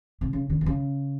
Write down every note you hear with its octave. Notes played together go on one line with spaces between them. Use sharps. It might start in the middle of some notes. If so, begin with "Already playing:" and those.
C3
C#3
D3
C3
C#3